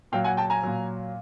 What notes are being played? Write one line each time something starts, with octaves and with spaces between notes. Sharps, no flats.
A#2 F#3 F5 G5
F#5 G#5
G5 A5
G#5 A#5
A#2 F#3